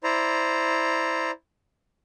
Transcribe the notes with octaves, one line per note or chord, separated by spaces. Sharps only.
E4 C5 D5 A#5